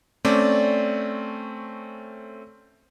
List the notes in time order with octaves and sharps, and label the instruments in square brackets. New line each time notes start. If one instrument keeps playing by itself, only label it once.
[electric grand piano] A3 C4 C#4 [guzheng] D5